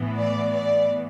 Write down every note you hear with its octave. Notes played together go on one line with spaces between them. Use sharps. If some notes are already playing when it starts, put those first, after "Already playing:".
Already playing: A2 E3 B3
D5
D5